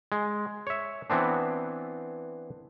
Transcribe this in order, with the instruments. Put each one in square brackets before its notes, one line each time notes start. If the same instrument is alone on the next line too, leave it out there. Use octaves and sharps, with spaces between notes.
[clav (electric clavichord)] G#3
C#5 E5
E3 B3 C4 D4